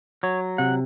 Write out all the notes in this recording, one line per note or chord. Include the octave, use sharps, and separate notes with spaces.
F#3 C#5
C3 F#5